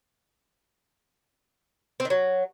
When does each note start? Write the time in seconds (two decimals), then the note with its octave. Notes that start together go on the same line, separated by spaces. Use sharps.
2.00 C4
2.05 D#3
2.10 F#3